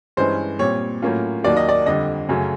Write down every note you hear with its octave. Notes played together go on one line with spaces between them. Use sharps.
G2 E3 G#3 C#4 C5
A#2 G3 C4 C#5
A2 F#3 A#3 C#4 F4
D#2 D#3 F#3 A#3 D5
D#5
D5
F2 D3 G3 D#5
F#2 C#3 F#3 A3 C#4